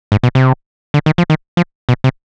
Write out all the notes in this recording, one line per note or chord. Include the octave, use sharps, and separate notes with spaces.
G#2
B2
C3
D3
D#3
F3
D#3
F3
B2
C3